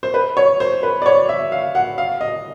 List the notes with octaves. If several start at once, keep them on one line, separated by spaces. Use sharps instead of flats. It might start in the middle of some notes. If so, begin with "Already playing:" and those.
C5
B4
C#5
C5
B4
D5
C#5
E5
F5
F#5
F5
D#5